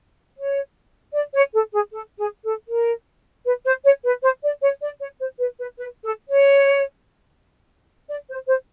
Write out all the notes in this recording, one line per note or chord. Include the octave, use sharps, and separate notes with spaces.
C#5
D5
C#5
A4
G#4
A4
G#4
A4
A#4
B4
C5
C#5
B4
C5
D5
C#5
D5
C#5
C5
B4
B4
B4
A4
C#5
D5
C5
C5